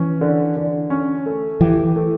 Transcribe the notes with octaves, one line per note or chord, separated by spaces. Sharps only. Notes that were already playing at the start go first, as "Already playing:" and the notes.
Already playing: E3 C#4
D3
D3
C#4
A3
E3 G4
A3